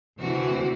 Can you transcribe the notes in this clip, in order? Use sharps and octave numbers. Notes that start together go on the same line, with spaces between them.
D2 C3 E3 F#4